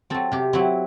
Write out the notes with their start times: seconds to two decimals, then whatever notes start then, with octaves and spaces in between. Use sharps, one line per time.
0.10 F#3 C4 A4
0.32 C3 G4
0.53 F#3 C4 E4